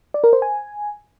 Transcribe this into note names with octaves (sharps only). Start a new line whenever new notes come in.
D5
A#4
C5
G#5